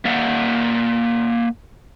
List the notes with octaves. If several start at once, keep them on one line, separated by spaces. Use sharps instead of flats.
A#3 D5 E5 F#5